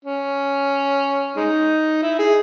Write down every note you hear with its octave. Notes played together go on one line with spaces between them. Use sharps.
C#4
G#3 D#4
E4
G#4